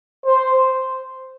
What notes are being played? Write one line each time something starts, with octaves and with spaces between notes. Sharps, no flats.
C5